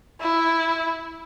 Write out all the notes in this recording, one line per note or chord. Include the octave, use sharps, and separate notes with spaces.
E4